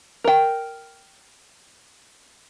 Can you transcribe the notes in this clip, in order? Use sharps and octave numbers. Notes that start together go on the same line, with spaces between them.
A#4 G5